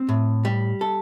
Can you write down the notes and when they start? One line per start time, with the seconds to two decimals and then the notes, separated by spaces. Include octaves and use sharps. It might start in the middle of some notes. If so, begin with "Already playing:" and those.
Already playing: C4
0.09 A2
0.45 G3
0.81 A4